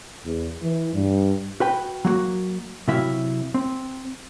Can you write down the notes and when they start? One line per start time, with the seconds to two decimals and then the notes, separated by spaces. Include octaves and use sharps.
0.25 E2
0.62 E3
0.93 G2
1.60 F#4 B4 G5
2.05 F#3 A#3 F#4
2.88 C3 F#3 E4 E5 F5
3.54 C4